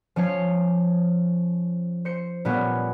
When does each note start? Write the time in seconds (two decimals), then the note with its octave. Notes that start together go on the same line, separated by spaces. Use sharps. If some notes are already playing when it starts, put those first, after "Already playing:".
0.16 F3 C#4 C#5 C7
2.05 C5 C#7
2.45 A#2 G3 B3 C#4